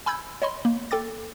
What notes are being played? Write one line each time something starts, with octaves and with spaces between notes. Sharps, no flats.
G#5 B5 E6 G6 G#6
C#5 D#5 B5 C6
A#3
A4 G5 D6 A6